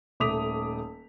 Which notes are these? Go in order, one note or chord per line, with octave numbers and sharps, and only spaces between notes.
D#1 A3 D6 D#6 B6 F7